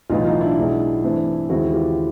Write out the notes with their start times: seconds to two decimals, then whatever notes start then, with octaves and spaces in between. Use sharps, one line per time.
0.09 B1 A2 E3 D#4 F4
0.25 D#4 F4
0.41 D4 E4
0.57 B1 B2 G#3
1.04 G2 E3 A3 C4
1.50 D#2 C#3 E3 G#3 C4 E4 F#4
1.73 F4 G4